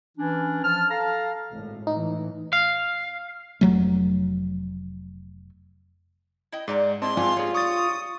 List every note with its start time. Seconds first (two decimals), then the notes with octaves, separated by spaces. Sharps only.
0.18 E3 C#4 D4
0.63 F3 A5 F6
0.91 A4 F5 A5 A#5
1.50 G#1 A2
1.87 A2 E3 D#4
2.53 F5
3.61 F1 F#3 A3
6.52 E4 D#5 G5
6.68 G#2 G3 D5 A#5
7.02 C4 D4 E4 G#4 D#5 A5 C6
7.17 G#2 C4 F4 G#5
7.37 G2 G3 G#4 C#5
7.54 C#6 D#6 A6